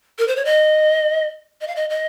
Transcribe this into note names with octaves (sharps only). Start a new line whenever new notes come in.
A#4
C5
C#5
D#5
D#5
F5
D#5
D#5